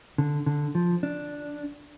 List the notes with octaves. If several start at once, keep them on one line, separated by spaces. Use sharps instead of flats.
D3
D3
F3
D4